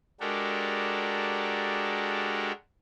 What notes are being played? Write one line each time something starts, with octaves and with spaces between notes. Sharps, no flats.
G#3 D4 F#4 G4 A4 A#4